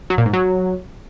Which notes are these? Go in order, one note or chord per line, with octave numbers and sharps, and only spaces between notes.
F#3
A#2
G#2
F#3